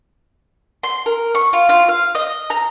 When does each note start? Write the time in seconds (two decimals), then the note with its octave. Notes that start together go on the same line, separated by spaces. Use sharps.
0.83 C6
1.06 A#4
1.35 C#6
1.53 F4
1.69 F4
1.88 F5
2.15 D#5
2.50 A#5